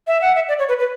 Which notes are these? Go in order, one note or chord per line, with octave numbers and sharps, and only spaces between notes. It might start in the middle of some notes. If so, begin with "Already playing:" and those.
E5
F#5
E5
D5
C#5
B4
B4